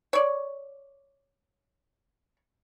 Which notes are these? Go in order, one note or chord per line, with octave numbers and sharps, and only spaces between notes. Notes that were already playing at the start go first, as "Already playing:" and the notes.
C#5 D5